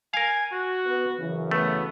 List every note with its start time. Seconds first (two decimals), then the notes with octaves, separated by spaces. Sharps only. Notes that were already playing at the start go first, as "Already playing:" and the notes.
0.14 A#4 F5 G#5
0.52 F#4
0.86 B3
1.18 F#2 C#3 E3
1.51 A3 B3